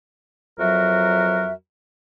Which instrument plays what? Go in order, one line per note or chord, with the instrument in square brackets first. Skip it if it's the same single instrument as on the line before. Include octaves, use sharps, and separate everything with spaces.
[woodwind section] F2 F#3 F#4 A#4 E5